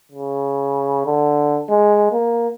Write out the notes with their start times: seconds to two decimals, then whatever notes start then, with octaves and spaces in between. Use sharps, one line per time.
0.12 C#3
1.06 D3
1.70 G#3
2.12 A#3